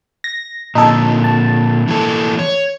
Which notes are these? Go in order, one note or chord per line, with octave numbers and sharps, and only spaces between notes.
A#6
A#2 D3 D#4 A4
A5
E3 A#3 A4
C#5